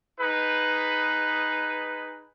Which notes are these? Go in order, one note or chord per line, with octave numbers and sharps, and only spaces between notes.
D#4 G#4 B4